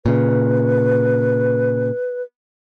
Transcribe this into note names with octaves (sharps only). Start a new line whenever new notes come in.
A#2 C#3 B4